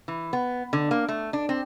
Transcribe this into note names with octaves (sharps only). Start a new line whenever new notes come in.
E3
B3
D3
A#3
A3
D4
C4